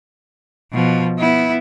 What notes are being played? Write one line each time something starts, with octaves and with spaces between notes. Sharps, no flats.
B2 F3
B3 E4